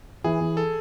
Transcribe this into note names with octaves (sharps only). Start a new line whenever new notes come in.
E3 G#4
E3
A4